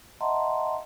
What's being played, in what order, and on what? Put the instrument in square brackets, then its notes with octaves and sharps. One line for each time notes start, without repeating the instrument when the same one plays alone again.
[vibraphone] D#5 E5 F#5 A5 A#5 C6